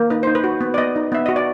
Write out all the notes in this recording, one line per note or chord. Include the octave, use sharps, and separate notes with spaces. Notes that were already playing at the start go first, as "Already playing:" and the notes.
Already playing: A#3
D#4 B4
D#4 C5
B4
F#4
B3
D5
B3 D#5
D#4
B3 E5
F#4 D#5
D5